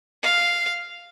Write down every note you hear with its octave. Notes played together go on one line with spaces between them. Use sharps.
F5